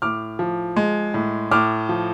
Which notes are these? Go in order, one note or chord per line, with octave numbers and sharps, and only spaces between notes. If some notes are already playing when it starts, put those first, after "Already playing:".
A2 D6 F6
F3
G#3
A2
A2 D6 F6
F3